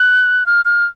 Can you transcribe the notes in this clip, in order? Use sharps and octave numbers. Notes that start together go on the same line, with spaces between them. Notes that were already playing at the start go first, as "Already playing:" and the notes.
Already playing: F#6
F6
F6